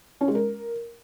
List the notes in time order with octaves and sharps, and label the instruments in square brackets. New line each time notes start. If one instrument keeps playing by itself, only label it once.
[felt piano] C#4
G#3
A#4